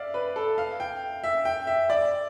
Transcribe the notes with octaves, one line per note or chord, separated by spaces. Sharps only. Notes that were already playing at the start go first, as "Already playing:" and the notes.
Already playing: D5 E5 F5
B4
A4
F5
G5
E5
G5
E5
D5